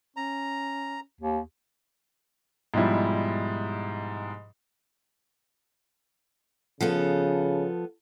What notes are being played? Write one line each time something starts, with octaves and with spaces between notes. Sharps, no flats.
C#4 A#5
D#2
G#2 B2 F3 G3 E4
C#3 F3 B3 A4